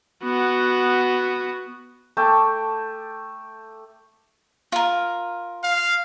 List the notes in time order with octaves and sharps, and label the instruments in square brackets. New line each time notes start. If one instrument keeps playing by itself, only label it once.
[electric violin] B3 F#4
[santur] A3 G5 A5 D6
[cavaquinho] F4 A#4
[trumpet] F5